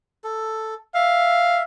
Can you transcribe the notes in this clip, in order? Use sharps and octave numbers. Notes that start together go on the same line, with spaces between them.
A4
E5 F5